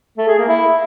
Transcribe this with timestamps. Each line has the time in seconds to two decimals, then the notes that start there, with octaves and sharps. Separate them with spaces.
0.18 A3
0.28 G#4
0.38 A#3
0.49 E4